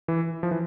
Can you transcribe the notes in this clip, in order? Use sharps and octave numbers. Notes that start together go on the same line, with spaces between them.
E3
F3
E3